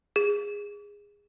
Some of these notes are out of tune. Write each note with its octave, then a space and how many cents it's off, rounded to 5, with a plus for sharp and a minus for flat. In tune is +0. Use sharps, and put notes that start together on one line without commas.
G#4 -15